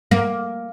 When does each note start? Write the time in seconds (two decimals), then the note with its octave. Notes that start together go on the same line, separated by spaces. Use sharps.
0.11 A#3